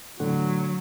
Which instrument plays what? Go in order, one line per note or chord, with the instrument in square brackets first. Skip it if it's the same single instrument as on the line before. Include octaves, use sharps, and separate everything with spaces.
[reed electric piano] A2 D3 F#5 [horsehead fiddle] F#3